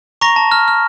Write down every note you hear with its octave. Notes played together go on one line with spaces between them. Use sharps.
A#5 C#6 A#6
A5
F6
F6